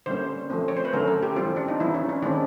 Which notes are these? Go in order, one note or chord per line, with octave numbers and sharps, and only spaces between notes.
D3 G3 A#3 C#4 C5
F3 A3 C4
C#5
C5
B4
D3 F#3 A3 C#4 A#4
A4
G4
E3 G3 C4 F4
D4
D#4
E3 G3 B3 E4
C#4
C#4
D#3 G#3 C4 D4